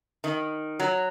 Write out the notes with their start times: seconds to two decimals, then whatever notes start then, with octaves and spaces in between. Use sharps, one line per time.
0.24 D#3
0.80 F#3